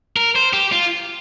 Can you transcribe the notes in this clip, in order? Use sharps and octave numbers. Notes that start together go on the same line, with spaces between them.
A#4
C5
G4
F4